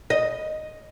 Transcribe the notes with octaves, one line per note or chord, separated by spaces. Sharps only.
D#5